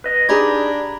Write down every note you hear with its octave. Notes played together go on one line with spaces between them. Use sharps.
B4 D#5
D4 D#4 G4 G#4 A#5 B5 G#6